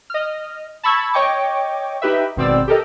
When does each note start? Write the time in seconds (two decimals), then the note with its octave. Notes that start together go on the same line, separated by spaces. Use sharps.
0.10 D#5 F6
0.83 A5 B5 C#6 E6 G#6
1.14 C#5 D#5 G5 C#6 D6
2.02 D#4 G4 B4 E5
2.37 G#1 B2 C4 D5 E6
2.68 G4 A4 A#4 D#5